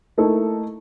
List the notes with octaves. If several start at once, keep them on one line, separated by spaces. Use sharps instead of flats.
A3 A#3 D#4 E4 A4